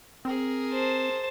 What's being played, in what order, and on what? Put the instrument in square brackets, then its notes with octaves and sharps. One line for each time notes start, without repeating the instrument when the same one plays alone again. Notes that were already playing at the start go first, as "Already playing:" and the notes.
[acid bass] C4 [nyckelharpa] G#4 A#4
[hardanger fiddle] C5 A5